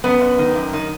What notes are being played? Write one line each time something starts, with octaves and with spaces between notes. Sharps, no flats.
F#2 B3
F#2
D#3
F#2
D#3